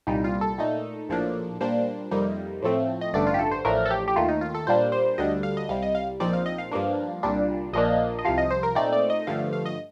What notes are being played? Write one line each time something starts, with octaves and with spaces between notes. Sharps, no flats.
C2 A#2 G3 D#4
F4
A4
A#2 A3 D#4
A#1 A2 F3 A#3 D4
A#2 G3 A#3 D4 C5
F2 C3 G3 A#3 D#4
A2 F3 A3 C4
D#5
A1 G2 D3 A3 D4 D5
F4
G4
A4
C5
A1 A2 F3 A3 D4 A#4
A4
G4
G4
D#2 D#3 A3 F4
D#4
F4
A4
A#2 G3 A#3 D4 C5
C5
D2 D3 G3 D4 D#5
F5
D#5
C2 C3 G3 F5
D#5
F5
A#1 A#2 F3 C4 D#4 D5
F5
D#5
F5
G2 F3 A#3 D4
C2 A#2 G3 D4
A#1 A#2 F3 A#3 D4 D#5
D#5
C2 C3 F3 F5
D#5
C5
A#4
A#2 A3 C4 D#4 D5
D5
D#5
G2 D3 F3 A3 F5
F5
D#5